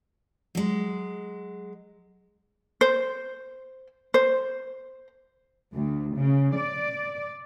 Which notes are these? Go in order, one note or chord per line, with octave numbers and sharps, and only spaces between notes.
F#3 G#3
C5
C5
D2
C#3
D5